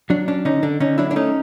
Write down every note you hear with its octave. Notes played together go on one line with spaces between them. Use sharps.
F#3 D4
C#4 D4
D3 C#4 D#4
D3 D4
D3 C#4 D#4
F#3 D4 E4
D4
A3 C#4 D#4